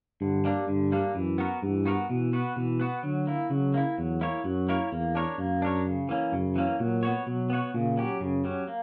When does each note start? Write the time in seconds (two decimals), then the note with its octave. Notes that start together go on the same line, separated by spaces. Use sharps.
0.21 G2 D3
0.45 G3 A#3 D4
0.68 G2 D3
0.92 G3 A#3 D4
1.15 F#2 E3
1.38 B3 F#4 A#4
1.62 G2 E3
1.85 B3 F#4 A#4
2.09 B2 E3
2.33 B3 F#4 B4
2.56 B2 E3
2.80 B3 F#4 B4
3.03 D3 F#3
3.27 A#3 E4
3.50 C#3 F#3
3.74 A#3 E4
3.98 E2 F#3
4.21 A#3 E4 A#4 C#5
4.44 F#2 F#3
4.69 A#3 E4 A#4 C#5
4.92 E2 A#3
5.15 D4 A#4 C#5
5.38 F#2 A#3
5.62 D4 A#4 C#5
5.85 C#3
6.09 E3 A#3 C#4
6.33 F#2 C#3
6.56 E3 A#3 C#4
6.79 A#2 F#3
7.03 B3 F#4 C#5
7.26 B2 F#3
7.50 B3 F#4 C#5
7.74 A#2 C#3
7.98 F#3 C#4 G4
8.21 F#2 C#3
8.44 F#3 C#4 G4
8.68 A#3